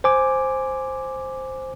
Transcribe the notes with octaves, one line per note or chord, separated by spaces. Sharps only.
C5 G#5 D6